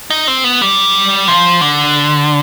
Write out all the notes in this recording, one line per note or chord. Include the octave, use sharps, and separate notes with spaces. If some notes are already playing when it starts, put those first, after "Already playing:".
D#4
C4
B3
G3
F3
D3